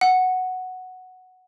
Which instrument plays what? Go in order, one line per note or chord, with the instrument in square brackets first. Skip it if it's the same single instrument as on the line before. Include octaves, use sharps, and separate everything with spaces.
[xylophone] F#5